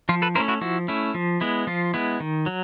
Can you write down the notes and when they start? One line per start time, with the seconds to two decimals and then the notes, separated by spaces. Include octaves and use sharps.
0.09 F3 F4
0.22 A4 B4
0.35 A3 C#4 E4 A#4 C5
0.48 E4 F#4
0.61 F3 E4 F#4
0.88 A3 C#4 E4
1.14 F3
1.41 G#3 B3 E4
1.67 F3 F4
1.94 G#3 B3 E4
2.20 D#3
2.46 F#3